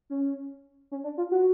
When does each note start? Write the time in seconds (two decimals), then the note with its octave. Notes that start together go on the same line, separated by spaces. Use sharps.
0.10 C#4
0.91 C#4
1.04 D4
1.17 F4
1.31 F#4